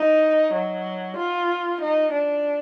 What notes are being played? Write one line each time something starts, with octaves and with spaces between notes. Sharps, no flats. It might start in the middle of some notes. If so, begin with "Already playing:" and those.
Already playing: D#4
F#3
F4
D#4
D4